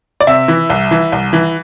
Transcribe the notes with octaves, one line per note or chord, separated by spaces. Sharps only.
D5
C3 E5
E3
C2
E3
C2
E3